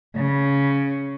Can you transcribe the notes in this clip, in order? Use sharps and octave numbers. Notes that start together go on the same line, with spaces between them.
C#3